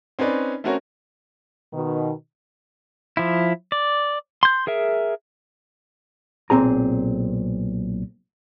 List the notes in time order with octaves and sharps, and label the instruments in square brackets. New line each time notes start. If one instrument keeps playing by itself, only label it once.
[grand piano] C4 C#4 D#4 B4 D5
A3 C4 C#4 F#4 A#4 C#5
[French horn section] B2 D#3
[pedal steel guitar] F3 E4
D5
C6 G6
G#4 A#4 E5
[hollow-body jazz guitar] B1 A#2 D#3 C4 G#4 A#5